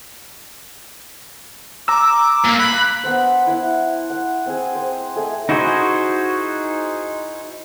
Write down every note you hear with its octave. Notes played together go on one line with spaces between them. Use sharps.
A#5 D6 E6
A#2 A#3
B5 F#6
B3 D4 C5
E4 F#5 C6
F#5
C4 G#4
C5
A3 G#4 D#5 G5
D#4 E4 F#4 G#4 C5